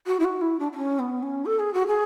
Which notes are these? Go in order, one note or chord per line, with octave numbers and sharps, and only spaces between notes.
F#4
E4
F#4
E4
D4
D4
C#4
B3
C#4
A4
G#4
F#4
G#4